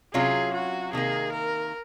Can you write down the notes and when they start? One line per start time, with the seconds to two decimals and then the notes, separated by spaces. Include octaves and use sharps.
0.14 C3 F#3 C#4 F4 G#4
0.54 F#4
0.93 C3 D#3 A#3 G#4
1.32 A#4